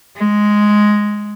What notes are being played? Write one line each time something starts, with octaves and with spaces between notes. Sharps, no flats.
G#3